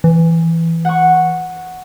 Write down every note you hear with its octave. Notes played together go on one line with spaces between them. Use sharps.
E3
F#5 C#6